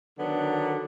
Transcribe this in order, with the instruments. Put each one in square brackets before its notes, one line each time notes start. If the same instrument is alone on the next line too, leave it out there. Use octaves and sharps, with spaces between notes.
[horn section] D3 D#3 F#3 B3 D4